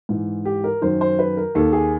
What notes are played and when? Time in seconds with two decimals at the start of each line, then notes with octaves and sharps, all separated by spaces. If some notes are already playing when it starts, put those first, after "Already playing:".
0.09 G#2 E3
0.45 G4
0.64 A#4
0.82 F#2 D#3 C5
1.01 C5
1.19 B4
1.37 A#4
1.55 D#2 D#3 A4
1.73 G#4